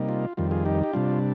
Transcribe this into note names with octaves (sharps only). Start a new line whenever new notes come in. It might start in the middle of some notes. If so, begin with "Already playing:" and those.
Already playing: C3 G3 A#3 D#4
F4
F2 D#3 G3 F4
F4 G#4
D#4 G4
G4
C3 G3 D4 F4